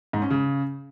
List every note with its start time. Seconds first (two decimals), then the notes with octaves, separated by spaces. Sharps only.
0.13 G#2
0.22 C#4
0.30 C#3